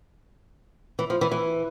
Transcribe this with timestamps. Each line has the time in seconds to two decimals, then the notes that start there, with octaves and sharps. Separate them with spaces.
0.99 E3
1.10 F3
1.21 E3
1.32 E3